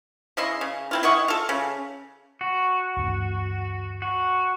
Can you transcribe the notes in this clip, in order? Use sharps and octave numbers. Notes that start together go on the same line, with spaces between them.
C#3 E4 D#5 C6
C#3
C4 E4 F4
E4 D#5 F#5 C#6
F4 A4
C#3
F#4
D2 G2 E3
F#4